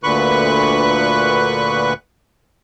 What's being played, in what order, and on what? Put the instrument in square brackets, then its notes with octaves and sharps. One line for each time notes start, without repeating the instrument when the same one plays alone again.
[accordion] D2 A#2 D3 B4 C#6 F#6